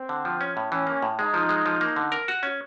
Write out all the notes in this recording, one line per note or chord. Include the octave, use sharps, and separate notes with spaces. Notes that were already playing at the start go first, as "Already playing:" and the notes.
Already playing: C4
D3
F3
C#4
A2
E3 C#4
A#3
A2
G#3 D#4
F3
G#3
F3
A#3
D3
A#4
F#4
C#4